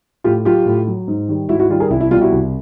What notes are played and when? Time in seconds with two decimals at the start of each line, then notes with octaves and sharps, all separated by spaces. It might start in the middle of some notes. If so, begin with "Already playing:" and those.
0.24 A2 F4 G4
0.45 F#3 F4 G4
0.66 A2
0.88 F#3
1.08 G#2
1.29 D#3 G3
1.49 G#2 E4 F#4
1.59 E4 F#4
1.70 D#3 G3 F4
1.80 G#4 A#4
1.90 C2 E4
2.01 E4
2.11 B2 G3 F4
2.21 E4 F#4
2.32 C2